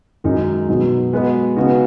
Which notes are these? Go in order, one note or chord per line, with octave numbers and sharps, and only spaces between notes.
F#2 D#3 G#3 D#4
B2 F#3 D#4
G#3 B3 F#4 B4 D#5
C#3 B3 D#4 F#4